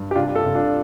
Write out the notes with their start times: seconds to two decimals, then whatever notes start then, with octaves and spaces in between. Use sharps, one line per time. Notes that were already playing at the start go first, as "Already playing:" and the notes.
Already playing: G2
0.11 G4
0.15 C3 D4 F4
0.35 F4 A4
0.45 C3
0.55 D4 F4